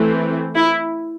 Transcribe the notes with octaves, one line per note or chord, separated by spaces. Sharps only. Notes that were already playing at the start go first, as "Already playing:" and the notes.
Already playing: E3 A3 C4
E4